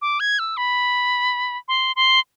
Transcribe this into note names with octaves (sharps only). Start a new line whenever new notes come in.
D6
G#6
E6
B5
C6
C6